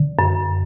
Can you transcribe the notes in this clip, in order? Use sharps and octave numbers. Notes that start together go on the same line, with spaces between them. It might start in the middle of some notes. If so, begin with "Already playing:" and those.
Already playing: D3
F#2